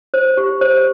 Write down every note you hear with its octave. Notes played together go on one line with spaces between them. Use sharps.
C5
G4
C5